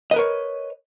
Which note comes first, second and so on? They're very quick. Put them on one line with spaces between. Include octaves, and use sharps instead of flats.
D#5 B4 A#4 C#5